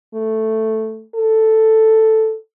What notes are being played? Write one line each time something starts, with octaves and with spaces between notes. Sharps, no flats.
A3
A4